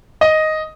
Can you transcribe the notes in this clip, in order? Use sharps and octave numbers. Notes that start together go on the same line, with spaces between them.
D#5